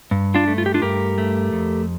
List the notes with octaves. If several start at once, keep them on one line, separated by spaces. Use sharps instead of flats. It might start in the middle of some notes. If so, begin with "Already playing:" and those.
G2
D4 F4
A3
F4
G4
D4 F4
G2 G4 A#4
A3
F2